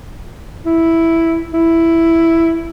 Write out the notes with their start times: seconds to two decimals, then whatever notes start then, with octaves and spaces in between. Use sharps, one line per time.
0.66 E4
1.53 E4